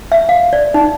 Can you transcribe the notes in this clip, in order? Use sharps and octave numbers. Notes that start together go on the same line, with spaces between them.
E5
F5
D5
D#4